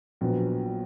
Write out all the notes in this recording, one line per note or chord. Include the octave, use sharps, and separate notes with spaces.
A#1 A#2 F#3 B3